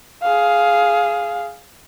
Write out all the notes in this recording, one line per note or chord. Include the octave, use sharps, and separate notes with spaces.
G#4 F5